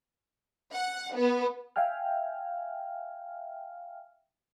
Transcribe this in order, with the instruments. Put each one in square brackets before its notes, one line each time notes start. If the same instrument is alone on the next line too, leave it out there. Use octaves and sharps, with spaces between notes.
[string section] F#5
B3
[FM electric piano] E5 F5 G5 G#5 F6